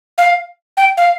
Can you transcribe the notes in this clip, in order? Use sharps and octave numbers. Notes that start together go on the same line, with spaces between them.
F5
G5
F5